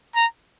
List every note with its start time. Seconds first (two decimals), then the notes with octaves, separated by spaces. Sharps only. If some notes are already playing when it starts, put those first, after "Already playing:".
0.15 A#5